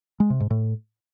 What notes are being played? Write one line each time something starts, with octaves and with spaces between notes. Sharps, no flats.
G#3
C3
G#2
A2